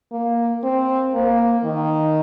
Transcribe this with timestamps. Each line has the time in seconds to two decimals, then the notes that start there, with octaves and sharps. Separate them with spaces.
0.12 A#3
0.64 C4
1.14 A#3
1.65 D#3